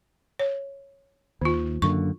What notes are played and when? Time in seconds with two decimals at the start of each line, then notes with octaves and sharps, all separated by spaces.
0.39 C#5
1.41 D#2 D#3 F4
1.82 F#2 D3 A#3 C#6